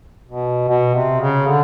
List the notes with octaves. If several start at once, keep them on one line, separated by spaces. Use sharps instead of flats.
B2
B2
C3
C#3
D3